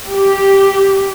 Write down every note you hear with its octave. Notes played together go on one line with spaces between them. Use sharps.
G4